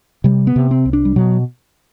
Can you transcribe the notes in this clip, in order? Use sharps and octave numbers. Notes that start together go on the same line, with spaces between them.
C3 G3
B3
C3
C4
C2
D4
G3
B2 F#3